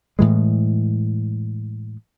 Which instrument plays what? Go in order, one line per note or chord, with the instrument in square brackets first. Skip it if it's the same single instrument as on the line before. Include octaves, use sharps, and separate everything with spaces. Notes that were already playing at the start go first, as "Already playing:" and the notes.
[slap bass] A2 E3 G#3